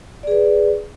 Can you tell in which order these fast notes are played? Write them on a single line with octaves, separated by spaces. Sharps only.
D5 G#4 B4